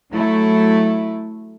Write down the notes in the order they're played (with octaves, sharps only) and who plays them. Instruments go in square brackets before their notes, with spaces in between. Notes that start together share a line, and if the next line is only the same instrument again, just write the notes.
[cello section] F#3 A3 E4